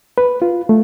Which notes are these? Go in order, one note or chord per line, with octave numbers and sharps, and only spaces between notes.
B4
F4
A3